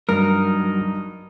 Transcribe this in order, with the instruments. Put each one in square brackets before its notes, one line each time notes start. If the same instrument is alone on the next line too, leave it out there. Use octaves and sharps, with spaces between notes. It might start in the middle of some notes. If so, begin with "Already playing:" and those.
[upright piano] G2 [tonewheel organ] F#3 [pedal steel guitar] D#4 F6 [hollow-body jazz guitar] A#4